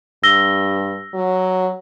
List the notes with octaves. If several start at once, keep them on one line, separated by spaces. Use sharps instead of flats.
G2 E6 A#6 G7
F#3